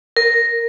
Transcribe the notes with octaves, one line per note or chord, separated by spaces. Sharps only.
A#4